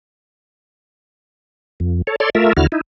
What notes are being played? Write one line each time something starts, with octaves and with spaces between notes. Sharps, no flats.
F2
A4 C#5
A4 C#5 D5 C6
A3 F4 A#4 E5
D#2 D3 E4 F#4 F6
D#4 E4